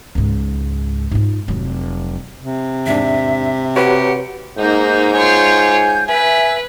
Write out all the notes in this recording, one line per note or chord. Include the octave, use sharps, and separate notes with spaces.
C#2 G#2
G#2 F4
F1 F#3
C3
E2 G#2 D4 E5
F#4 G4 B4 C#5 F#5
G#2 A#3 D#4 G6
F4 C#5 G#5
B4 E5 G#5